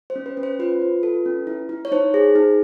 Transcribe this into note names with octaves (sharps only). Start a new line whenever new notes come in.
C5
C#4
B4
C#4
C5
F4 B4
F4
A4
C#4
E4
E4
C#5
D#4 C5
G#4
D#4